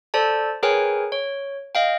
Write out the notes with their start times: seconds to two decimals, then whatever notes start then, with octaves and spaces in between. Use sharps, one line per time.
0.14 A4 C5 D5 A5
0.63 G#4 A#4 B4 C#5 G5 G#5
1.12 C#5
1.75 D#5 F5 G5